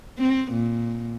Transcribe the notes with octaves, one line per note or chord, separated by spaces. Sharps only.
C4
A#2